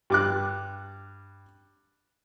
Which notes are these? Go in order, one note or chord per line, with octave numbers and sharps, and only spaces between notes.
G2 D6 F#6